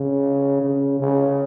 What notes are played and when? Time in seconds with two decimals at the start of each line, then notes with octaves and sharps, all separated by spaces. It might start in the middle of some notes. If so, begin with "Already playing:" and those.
Already playing: C#3
0.62 C#3
1.00 C#3